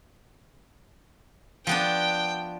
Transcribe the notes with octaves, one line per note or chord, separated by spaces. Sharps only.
F3 B3 D4 G5